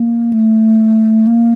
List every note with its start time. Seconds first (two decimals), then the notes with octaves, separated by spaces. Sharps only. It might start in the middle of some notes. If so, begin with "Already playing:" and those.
Already playing: A#3
0.33 A3
1.27 A#3